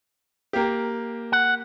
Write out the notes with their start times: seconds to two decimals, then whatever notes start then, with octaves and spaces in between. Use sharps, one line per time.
0.53 A#3 G4
1.32 F#5